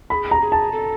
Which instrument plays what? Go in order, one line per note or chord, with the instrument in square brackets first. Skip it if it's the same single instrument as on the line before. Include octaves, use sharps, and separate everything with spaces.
[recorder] A4 [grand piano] B5
[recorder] G#4
[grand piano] A#5
[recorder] G#4
[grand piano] A5
[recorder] A4